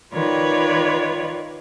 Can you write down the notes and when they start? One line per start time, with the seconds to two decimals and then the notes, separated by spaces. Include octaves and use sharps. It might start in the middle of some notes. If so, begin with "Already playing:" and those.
0.13 D#3 F4 B4 C#5 D5